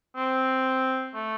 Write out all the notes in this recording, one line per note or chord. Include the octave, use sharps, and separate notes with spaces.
C4
A3